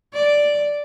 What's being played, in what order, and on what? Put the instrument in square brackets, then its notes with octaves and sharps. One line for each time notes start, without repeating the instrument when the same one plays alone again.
[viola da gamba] D5